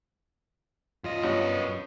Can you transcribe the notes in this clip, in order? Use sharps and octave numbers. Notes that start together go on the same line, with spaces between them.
F#2 F4 D#5
G2 B3 F4 F#4 C#5